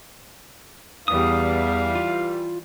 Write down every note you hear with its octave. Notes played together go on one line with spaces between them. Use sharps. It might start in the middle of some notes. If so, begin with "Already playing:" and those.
E2 E3 G3 F5 D#6
F4